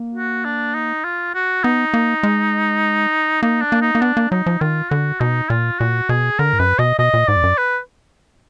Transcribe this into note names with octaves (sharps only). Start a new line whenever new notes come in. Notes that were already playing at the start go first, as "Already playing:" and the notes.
Already playing: A#3
F#4
D4
D#4
F4
F#4
B3 D#4
A#3
G#3
A#3 D#4
D4
A#3
D#4
A#3
B3 D4
A#3
F#3 D#4
F3
D#3 F4
D3 F#4
B2 D#4
A#2 F4
A#2 F#4
B2 G#4
D3 A#4
G#2
F#2 B4
B2 D#5
B2 D#5
A#2
G#2 D5
F2
F#2
B4